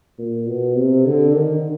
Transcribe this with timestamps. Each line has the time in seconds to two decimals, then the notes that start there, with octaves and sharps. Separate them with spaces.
0.18 A#2
0.47 B2
0.76 C3
1.06 D3
1.34 D#3